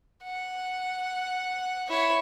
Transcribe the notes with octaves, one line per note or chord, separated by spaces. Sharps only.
F#5
E4 C#5